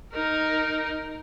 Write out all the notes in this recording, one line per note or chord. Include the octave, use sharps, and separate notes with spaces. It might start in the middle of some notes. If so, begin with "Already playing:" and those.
D#4 A#4